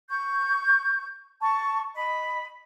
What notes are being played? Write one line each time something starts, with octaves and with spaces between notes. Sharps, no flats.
C#6 G6
A5 C#6
D#5 B5